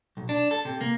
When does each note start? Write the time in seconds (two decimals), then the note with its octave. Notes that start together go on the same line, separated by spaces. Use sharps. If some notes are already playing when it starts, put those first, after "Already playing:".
0.17 B1
0.29 D4
0.51 A4
0.65 C3
0.81 A#3